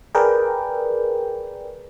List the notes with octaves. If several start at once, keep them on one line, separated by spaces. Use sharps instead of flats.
G#4 A#4 B4 D5 G5